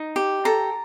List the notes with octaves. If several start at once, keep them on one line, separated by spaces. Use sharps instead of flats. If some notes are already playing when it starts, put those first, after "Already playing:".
Already playing: D#4
G4
A4 A#5